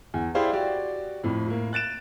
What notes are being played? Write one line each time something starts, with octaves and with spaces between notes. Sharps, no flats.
E2
E4 G4 G#4 C5 D5 F5
F#4 G4 D5
F2 A2
A2 A#3
F#6 A6 D7 E7